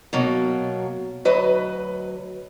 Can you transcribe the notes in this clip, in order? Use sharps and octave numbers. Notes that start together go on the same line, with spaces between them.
B2 F#3 A#3
D2 F#3 B4 D#5